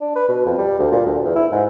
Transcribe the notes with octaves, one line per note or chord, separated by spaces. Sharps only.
D4
B4
B2
F2
G3
D2
A#2
D2
E2
E4
G#2